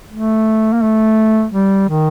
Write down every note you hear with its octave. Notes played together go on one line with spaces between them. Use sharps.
A3
A#3
A3
G3
D#3